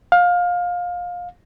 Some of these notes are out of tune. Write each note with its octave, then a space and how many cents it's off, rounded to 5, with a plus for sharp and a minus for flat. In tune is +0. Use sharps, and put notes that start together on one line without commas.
F5 +25